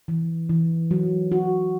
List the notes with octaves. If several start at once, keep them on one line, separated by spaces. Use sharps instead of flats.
E3
E3
F#3
F#4